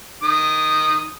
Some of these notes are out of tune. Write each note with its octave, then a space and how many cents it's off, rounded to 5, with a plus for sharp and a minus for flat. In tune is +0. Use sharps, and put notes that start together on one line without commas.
D#3 +0 D#6 -10